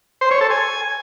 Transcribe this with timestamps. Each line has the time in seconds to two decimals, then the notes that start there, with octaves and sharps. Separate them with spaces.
0.21 C5
0.31 C#5
0.41 A4
0.50 G#5